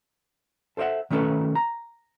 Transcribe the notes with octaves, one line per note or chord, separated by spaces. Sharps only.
A4 C5 D5 E5 F#5
D#3 A3 C#4 G#4 A4 B4
A#5